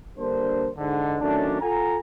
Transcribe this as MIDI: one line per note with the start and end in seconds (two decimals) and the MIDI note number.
0.18 0.69 50
0.18 0.69 55
0.18 0.69 58
0.18 0.69 62
0.18 0.69 72
0.78 1.16 44
0.78 1.16 50
1.21 1.61 51
1.21 1.61 54
1.21 1.61 57
1.21 1.61 61
1.21 1.61 62
1.61 1.97 65
1.61 1.97 69
1.61 1.97 78
1.61 1.97 80
1.61 1.97 82